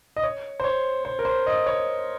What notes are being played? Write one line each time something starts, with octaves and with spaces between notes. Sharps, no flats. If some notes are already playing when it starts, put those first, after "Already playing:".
D#5
C#5
C5
C#5
C5
A#4
C5
D#5
C#5